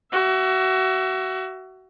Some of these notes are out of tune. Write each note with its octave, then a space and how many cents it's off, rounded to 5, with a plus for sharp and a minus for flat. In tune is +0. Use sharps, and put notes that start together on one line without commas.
F#4 +25 E5 +25